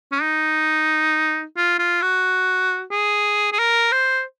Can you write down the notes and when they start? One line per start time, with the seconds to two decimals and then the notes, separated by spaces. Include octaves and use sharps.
0.12 C#4
0.22 D#4
1.57 F4
1.79 F4
2.02 F#4
2.91 G#4
3.53 G#4
3.59 A#4
3.92 C5